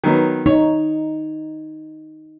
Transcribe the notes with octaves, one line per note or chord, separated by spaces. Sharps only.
D#3 F#3 B3
D#4 C#5